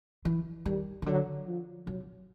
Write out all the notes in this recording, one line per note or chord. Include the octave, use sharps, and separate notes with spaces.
E3
D#3 G3
C#3
D3 F#3
F3
C3 F#3